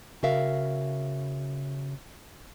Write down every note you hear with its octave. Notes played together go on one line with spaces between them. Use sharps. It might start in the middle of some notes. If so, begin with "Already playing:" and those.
C#3 F#4 A#4 E5 F5